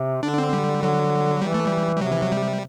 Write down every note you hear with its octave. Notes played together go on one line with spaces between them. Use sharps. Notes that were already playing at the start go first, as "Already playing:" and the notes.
Already playing: C3
D3 D4
C4
G3
D3 F#3
E3 G3
A3
G3
G3
C3 F#3
E3
F#3
G3